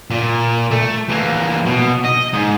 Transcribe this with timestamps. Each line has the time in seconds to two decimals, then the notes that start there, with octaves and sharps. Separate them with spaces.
0.10 A#2
0.71 A3
1.09 E3 A#3
1.66 B2
2.04 D#5
2.33 G#2